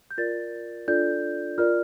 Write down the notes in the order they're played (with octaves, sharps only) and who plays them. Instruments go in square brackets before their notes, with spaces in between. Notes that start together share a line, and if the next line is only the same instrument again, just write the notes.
[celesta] G6
F4 A#4 D5 A6
D4 F4 A4 D5 G6
F4 A#4 D5 F6